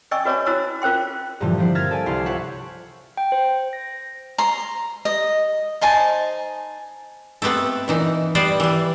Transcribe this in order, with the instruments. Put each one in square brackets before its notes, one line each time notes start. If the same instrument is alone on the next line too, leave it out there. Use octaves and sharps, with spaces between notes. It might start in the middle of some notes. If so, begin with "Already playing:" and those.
[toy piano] D5 D#5 G5 G#5 C#6 E6
F#4 B4 C#5 D5 G#5 A#5
E4 F#4 C5 A#5 E6
F4 A#4 C5 G5 C6
[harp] G2 A#2 D3 E3 F3 G3
F3 C4 E4
A#4 E5 F6 G#6 A6
A4 D5 G#5
C2 E4 C6 F6
F4 G4 C#5 E5 F#5 C#6
[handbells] G5
C5
A#6
[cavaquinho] A#5 C6
D#5
D#4 C5 G#5 A5
[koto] A3 B3 C4 G4 A4
A#2 E3 D#4
G3 B3 C5 D5
E3 G3